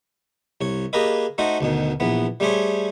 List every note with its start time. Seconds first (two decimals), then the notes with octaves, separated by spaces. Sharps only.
0.61 C2 C#5
0.93 A#3 G4 G#4 A#4 B4 D#5
1.38 A3 D#4 F#4 C5 D#5
1.61 D2 B2 D#3
2.00 A#1 E3 B3
2.40 G3 A3 G4 G#4 C5 C#5